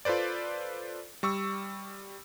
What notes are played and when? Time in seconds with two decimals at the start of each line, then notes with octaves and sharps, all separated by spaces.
0.05 F4 A4 B4 C5 D5
1.23 G3 C#6 E6